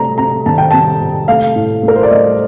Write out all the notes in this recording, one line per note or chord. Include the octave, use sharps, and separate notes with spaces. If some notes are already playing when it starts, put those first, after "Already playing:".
Already playing: C3 A3 A#5
C3 A#5
D#3 A5
G5
C3 A5
C3
A3 F5
A2
A3
A#4
C5
D5
A3 D#5